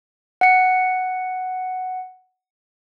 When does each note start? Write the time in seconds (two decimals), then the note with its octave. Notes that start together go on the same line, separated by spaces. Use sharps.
0.41 F#5 C#7